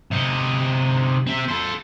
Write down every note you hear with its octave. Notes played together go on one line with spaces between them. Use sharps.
C3 D#4
C4 E5
A4 C5